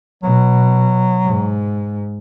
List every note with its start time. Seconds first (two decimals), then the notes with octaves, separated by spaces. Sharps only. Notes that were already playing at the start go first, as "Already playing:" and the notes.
0.23 B2 F#3
1.25 G#2